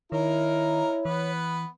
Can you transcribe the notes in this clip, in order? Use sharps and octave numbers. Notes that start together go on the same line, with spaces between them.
D#3 A#3 D#4 E4 A#4 C#5
E3 B3 B4